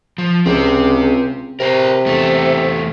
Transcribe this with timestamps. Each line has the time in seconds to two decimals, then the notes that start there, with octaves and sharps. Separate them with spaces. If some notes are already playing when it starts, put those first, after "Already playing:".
0.18 F3
0.46 C#2 C4 G4
1.60 C3 A#4 C5
2.06 E2 A3